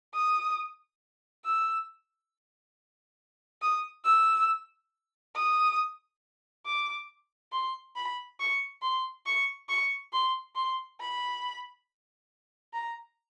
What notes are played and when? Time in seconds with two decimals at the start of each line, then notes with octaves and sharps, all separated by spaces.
0.14 D#6
1.45 E6
3.62 D#6
4.04 E6
5.35 D#6
6.66 D6
7.52 C6
7.96 B5
8.40 C#6
8.82 C6
9.26 C#6
9.69 C#6
10.13 C6
10.56 C6
11.00 B5
12.73 A#5